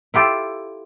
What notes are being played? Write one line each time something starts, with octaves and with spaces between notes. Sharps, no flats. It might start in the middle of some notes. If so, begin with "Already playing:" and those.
E4 F4 G4 A4